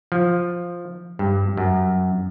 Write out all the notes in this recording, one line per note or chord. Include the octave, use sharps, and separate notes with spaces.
F3
G2
F#2